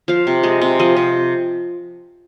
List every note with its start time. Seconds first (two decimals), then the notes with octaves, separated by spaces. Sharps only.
0.08 F3 F5
0.27 C3
0.43 G#3 D#5
0.62 C3
0.79 F3 D#5
0.97 C3